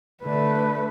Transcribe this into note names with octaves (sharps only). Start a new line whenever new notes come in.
D3 A3 D4 B4